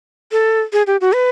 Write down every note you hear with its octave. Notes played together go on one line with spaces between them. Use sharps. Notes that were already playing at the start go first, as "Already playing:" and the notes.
A4
G#4
G4
F#4
B4